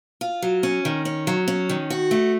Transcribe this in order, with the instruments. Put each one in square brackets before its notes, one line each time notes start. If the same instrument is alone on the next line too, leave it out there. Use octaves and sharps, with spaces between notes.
[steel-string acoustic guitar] F4
F#3
C#4
D#3
C#4
F#3
C#4
D#3
F#4
A3